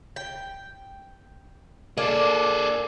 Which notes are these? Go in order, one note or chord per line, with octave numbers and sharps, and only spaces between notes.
G5
A#3 D4 G#4 A4 D5